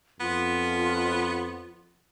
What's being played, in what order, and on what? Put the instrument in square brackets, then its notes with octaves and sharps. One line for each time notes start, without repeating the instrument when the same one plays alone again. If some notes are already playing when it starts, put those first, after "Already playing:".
[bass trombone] F2 [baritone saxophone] B3 [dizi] F4